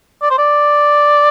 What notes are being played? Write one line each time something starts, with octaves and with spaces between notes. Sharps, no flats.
D5
C5
D5